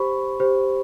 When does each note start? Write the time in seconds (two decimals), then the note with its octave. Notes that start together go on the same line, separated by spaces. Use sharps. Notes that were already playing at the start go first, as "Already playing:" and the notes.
Already playing: G4 C5 B5 C#6
0.40 G4 C5